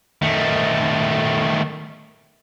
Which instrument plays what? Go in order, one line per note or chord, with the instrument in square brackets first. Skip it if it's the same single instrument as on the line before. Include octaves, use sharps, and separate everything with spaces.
[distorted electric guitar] D#3 A3